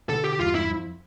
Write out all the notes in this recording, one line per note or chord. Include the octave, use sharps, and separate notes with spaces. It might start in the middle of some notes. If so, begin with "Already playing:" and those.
B2 D3 A4
G4
E2 G2 F4
E4
F2